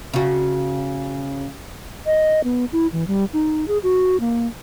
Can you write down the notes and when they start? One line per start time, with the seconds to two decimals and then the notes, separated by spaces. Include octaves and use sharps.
0.13 C#3 F#4
2.06 D#5
2.44 B3
2.73 E4
2.93 E3
3.08 G3
3.33 D#4
3.68 G#4
3.83 F#4
4.20 A#3